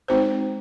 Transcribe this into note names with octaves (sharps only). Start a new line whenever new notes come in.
G#3 C4 D#4 F#4 C5